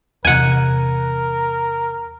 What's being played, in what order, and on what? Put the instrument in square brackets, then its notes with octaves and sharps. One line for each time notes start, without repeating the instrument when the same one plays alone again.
[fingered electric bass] E2 C3 [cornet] A#4 [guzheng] F#5 G#5